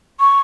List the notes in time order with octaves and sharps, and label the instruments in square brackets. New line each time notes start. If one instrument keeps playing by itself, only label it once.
[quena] C#6